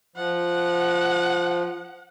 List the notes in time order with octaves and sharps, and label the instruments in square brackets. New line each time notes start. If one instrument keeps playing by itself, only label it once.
[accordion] F3 [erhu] F#5